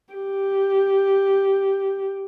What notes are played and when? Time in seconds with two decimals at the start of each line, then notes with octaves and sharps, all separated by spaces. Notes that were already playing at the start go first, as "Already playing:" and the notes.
0.14 G4